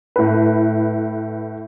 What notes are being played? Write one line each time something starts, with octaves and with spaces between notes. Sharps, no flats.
A2 B4